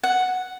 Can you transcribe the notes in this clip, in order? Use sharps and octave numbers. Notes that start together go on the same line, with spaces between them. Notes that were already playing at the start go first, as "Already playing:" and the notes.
F#5